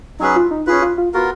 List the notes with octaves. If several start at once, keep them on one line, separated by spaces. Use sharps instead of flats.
F#3 C#4 D#4 G#4 B4
F4
D#4
C#4 F4 G#4 B4
F4
F4
B3 F4 F#4 A#4